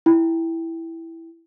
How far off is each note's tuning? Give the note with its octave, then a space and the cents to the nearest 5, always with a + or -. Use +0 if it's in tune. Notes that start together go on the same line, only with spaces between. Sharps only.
E4 +0 G5 +10